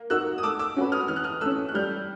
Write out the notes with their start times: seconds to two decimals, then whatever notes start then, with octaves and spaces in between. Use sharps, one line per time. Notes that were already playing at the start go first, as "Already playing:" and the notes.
Already playing: A#3
0.10 D#4 F#4 A#4 E6 F#6
0.38 D#6
0.43 A3 D6 E6
0.59 D6 E6
0.76 C#4 F#4 B4
0.92 D#6 F6
1.08 E3 F6
1.16 F#6
1.24 D#6 F6
1.41 A3 C#4 E6 F#6
1.69 F#6
1.74 G3 F6 G6